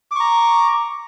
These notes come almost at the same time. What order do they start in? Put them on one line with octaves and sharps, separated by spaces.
D6 C#6 A#5